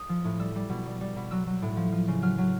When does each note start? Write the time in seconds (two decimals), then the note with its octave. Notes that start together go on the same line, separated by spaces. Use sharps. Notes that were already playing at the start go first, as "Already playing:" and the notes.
Already playing: D#6
0.09 F3
0.24 A2
0.39 G3 E6
0.55 G3
0.69 B2
0.86 G3
1.00 G3
1.16 B2
1.31 F#3 E6
1.46 F#3
1.62 A2
1.77 F3
1.92 F3
2.08 C#3
2.22 F#3 F6
2.38 F#3